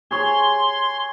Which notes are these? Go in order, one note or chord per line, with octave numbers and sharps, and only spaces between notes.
G#4 C#5 C6